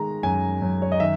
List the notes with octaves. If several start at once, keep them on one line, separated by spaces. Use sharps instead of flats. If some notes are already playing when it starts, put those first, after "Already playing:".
Already playing: D#3 G#3 A#5
F#2 G#5
F#2
C#5
D#5
D#3 E5